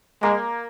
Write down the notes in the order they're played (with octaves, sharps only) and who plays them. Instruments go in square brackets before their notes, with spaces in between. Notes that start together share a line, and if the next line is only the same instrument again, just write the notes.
[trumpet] G#3 [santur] A#3